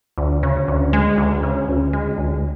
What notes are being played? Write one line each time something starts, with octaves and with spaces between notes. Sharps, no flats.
D2
C#3
D2
G#3
D2
C#3
D2
G#3
D2